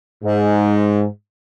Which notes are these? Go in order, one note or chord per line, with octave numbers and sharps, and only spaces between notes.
G#2